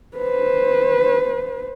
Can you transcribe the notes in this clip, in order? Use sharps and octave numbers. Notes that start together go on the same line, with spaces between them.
B4 C5